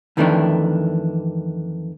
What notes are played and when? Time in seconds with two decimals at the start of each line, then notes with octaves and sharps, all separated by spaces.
0.17 F2 D#3 E3 A3 B3 D4